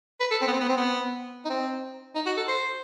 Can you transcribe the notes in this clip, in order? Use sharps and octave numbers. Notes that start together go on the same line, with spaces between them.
B4
A4
C4
B3
C4
B3
C4
B3
D#4
C4
D#4
F#4
A4
C5